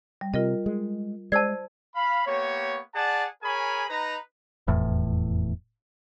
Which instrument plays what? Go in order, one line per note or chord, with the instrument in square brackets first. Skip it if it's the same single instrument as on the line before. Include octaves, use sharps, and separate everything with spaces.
[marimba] G3
[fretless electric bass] C3 [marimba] F4 A#4 D#5
[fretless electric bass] G#3
[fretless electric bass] G#3 [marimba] C5 E6 [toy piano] D5 A5
[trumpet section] F5 B5
A#3 B3 G4 C#5
G#4 D5 F#5 A5
G#4 A#4 C#5 G#5 B5
D#4 B4 A#5
[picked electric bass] F1 E2 A2